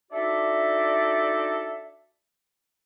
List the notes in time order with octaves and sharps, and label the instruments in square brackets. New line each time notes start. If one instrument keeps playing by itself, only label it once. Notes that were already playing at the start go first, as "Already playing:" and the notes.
[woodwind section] D4 D#4 F#4 A4 D5 E5